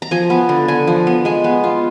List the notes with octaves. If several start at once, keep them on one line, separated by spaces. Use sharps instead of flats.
A#5
F3 G#5
B3
D3
D3 G#5
F3
B3
G#3 G#5
B3
F4